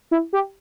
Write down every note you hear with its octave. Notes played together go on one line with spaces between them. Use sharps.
E4
G4